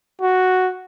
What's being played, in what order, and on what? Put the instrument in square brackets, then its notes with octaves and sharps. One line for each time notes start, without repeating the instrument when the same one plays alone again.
[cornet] F#4